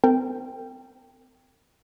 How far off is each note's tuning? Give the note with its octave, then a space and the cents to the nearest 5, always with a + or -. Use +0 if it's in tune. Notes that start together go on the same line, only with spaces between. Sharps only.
C4 -35 A#4 -45 G5 +0